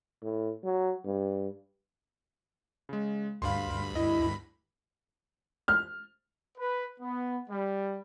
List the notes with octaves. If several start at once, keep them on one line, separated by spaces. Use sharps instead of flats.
A2
F#3
G2
C#3 G#3
D2 G2 F5 B5 C6
E4 D#5 A#6
F6
B4
B3
G3